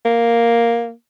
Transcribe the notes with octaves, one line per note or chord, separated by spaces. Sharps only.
A#3